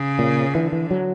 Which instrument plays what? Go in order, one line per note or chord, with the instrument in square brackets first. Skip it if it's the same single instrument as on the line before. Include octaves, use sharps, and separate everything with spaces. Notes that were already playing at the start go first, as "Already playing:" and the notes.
Already playing: [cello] C#3
[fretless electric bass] A#2
[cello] D3 [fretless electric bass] E3
[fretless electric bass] E3
F#3